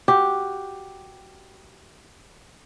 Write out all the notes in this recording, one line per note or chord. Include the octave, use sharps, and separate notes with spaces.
F#4 G4